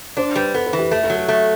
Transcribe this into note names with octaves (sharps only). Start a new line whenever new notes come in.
D4 C5
G3 B4
B3 A4
B4
E3
G4
A3 A4
A4
F#3
A4
A3